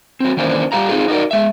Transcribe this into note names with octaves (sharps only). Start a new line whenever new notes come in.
F#3 C4
D#3 E3 A#3 C#4 D4 C5
G3 G4 F5 A#5
C4 D#4 F4 G#4
D#4 F#4 A#4 D5
G#3 E5